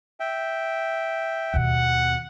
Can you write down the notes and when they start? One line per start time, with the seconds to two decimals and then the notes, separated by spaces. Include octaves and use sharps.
0.20 E5 G5
1.54 D#2 B2 F#5